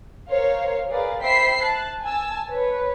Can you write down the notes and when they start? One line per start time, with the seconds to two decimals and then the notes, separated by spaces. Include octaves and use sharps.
0.30 A#4 C5 C#5 F5
0.90 G#4 A#4 B4 D5 F5
1.23 C5 E5 G5 B5 B6 C7
1.63 A5 F#6
2.03 G#5 A5 E6
2.51 B4 C#5